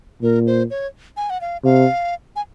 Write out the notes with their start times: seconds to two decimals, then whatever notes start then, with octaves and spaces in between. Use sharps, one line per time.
0.22 A#2 A#4
0.47 C5
0.70 C#5
1.17 G#5
1.30 F#5
1.41 F5
1.64 C3 F5
2.36 G#5